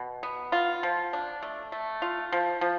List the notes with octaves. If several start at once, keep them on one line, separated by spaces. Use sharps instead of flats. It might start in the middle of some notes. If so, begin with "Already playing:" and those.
Already playing: B2
B3
F4
F3
D4
A3
A3
F4
F3
F3